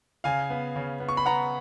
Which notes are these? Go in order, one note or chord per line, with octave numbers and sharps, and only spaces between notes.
C#3 F5 G#5
B3
C#3
B3
C#6
B5
B3 F#5 A#5